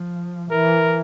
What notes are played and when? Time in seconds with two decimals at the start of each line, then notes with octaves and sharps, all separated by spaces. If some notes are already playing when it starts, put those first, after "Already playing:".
Already playing: F3
0.52 E3 A#4